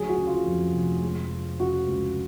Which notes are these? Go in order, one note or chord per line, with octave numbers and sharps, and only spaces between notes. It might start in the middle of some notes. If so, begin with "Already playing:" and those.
Already playing: D2 F#3 G#4
F#4
C#3
F4
F2
F1
G#3
F3
C#3 F#4
C#2